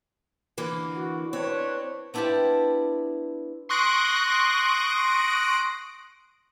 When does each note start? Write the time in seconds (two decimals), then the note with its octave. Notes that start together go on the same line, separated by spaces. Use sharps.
0.57 D3 E3 A#3
0.96 F#4
1.33 C4 D4 B4 C#5
2.14 B3 D4 E4 F4 G4 A5
3.69 C6 C#6 D#6 F#6 A#6 D7